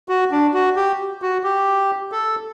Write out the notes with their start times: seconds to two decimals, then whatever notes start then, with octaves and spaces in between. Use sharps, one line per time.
0.09 F#4
0.31 D4
0.54 F#4
0.76 G4
1.22 F#4
1.44 G4
2.12 A4